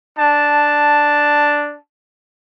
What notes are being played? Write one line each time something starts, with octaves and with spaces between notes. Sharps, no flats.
D4 A5